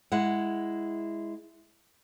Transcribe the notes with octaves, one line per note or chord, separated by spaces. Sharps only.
G#3 E4 F#5